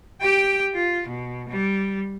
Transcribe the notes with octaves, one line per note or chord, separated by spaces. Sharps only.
G4 G5
F4
B2
G3